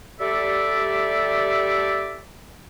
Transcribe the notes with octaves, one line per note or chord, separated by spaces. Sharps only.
G3 A3 G4 A4 D5 E5